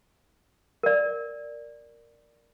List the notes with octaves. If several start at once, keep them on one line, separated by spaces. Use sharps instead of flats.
A#4 D5